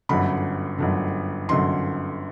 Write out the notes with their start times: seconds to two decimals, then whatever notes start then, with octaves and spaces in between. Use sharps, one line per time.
0.09 G1 F#2 D3 B5
0.79 G1 F#2 D3
1.49 G1 F#2 D3 C6